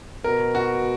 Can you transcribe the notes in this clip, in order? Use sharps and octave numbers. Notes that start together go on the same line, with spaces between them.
B2 A#4
F#4